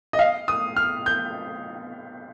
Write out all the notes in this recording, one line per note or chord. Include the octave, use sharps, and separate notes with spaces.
D#5
F5
D#6
F6
G6